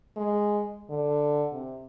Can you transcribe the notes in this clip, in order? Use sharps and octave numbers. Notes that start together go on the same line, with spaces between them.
G#3
D3
C3